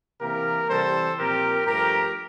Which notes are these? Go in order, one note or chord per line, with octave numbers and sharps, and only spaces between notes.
C3 E3 A#3 G4 A#4
C3 E3 G3 C4 A4 C5
A#2 F3 C4 G4 A#4
G2 F3 A3 G4 A#4